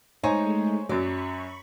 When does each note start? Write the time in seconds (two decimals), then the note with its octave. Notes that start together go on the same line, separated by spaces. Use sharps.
0.23 G#3 A3 D#4 C5 C#5 G#5
0.89 F#2 F#3 D5 B5 C#6